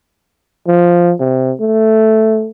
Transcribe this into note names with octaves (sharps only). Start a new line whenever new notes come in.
F3
C3
A3